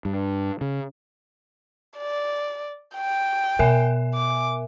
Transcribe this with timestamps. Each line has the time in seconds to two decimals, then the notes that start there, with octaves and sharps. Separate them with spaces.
0.05 G2
0.61 C#3
1.98 D5
2.95 G5
3.59 B2 A#4 E5 G#5
4.14 D6